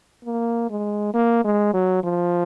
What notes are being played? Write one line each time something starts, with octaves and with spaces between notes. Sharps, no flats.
A#3
G#3
A#3
G#3
F#3
F3